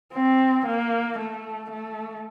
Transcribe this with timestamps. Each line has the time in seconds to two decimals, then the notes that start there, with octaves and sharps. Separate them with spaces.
0.13 C4
0.66 A#3
1.18 A3
1.70 A3